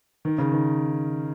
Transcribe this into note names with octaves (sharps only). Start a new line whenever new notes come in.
D#3
C#3
D#3